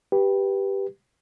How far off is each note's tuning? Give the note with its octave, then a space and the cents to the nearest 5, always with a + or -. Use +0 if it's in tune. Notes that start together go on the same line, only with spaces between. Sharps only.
G4 +0 B4 -15